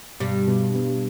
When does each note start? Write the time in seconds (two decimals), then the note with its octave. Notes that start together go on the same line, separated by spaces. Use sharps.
0.20 G2 B2 G3
0.48 B2
0.75 B3